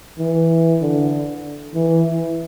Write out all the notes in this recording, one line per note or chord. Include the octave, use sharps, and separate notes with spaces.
E3
D3
E3